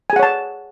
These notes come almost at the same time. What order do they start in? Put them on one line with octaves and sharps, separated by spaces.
G#5 G#4 F#5 C#5 A5